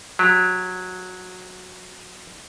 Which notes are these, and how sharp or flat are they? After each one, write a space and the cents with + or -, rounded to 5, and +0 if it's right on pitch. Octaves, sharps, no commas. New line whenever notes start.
F#3 -15 G4 +20